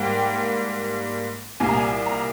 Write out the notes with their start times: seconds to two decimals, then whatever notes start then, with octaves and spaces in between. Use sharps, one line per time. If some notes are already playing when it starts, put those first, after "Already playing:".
Already playing: G#2 G3 A#3 G5
1.60 C2 A#2 G3 A#3 G#5
1.69 A#5
1.77 G#5
2.06 A#5